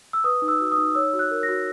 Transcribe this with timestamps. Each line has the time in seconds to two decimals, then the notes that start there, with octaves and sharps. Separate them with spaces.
0.13 E6
0.24 B4 D#6
0.42 D#4
0.48 E6
0.60 F#4
0.72 D#6
0.78 D#4
0.95 C#5 E6
1.14 F#4
1.19 F#6
1.31 A#4
1.43 A#6
1.49 F#4